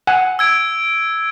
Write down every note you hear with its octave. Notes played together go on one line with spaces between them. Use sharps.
F#5 G#5
E6 G#6 D7